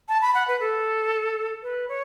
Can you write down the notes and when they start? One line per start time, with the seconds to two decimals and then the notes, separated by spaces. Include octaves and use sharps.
0.08 A5
0.22 B5
0.34 F#5
0.48 B4
0.60 A4
1.63 B4
1.88 C#5